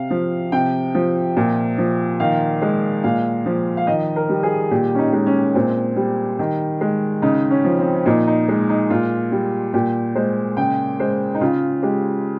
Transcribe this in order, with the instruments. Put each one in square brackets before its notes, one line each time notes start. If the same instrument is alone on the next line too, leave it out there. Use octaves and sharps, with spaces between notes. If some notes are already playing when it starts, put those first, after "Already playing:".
Already playing: [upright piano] C3 F5
F3
C3 G5
F3
A#2
F3
D#3 F5
G#3
A#2 F5
F3
F5
D#3 D#5
A#4
G3
G#4
A#2 G4
C#4
D#4
G#3
C#4
A#2 C4
G3
D#3
G#3
C#3 D#4
C#4
F3
C4
A#2 D#4
D#4
G#3
D#4
A#2 F4
G3
A#2 G4
G#3 C5
C#3 G5
G#3 C5
D#4
C#3 F4
G#3 G4